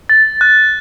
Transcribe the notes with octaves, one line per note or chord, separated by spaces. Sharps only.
A6
F#6